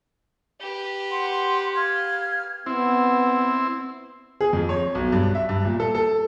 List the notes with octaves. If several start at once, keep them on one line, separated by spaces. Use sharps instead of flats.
G4 B4
F#5 C6
F5 F6 G#6
B3 C4 E4
G#4
F2
C#5
B1
G2
E5
G2
A#2
A4
A4